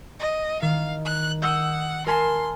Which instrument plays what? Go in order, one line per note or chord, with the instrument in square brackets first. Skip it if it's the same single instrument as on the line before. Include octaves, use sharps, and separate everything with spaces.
[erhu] D#5
[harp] D#3 [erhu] F5
[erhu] F#6
[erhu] F#5 [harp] D#6 E6 G6
[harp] A#4 G#5 A5 [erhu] C6